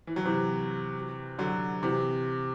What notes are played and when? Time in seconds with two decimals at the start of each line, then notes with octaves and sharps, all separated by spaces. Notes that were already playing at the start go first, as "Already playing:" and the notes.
0.07 E3
0.16 F#3
0.25 C3 E3
1.38 D3 F#3
1.82 C3 E3